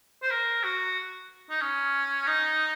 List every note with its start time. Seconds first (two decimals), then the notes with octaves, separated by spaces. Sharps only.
0.22 C5
0.31 A#4
0.64 F#4
1.50 D#4
1.61 C#4
2.27 D#4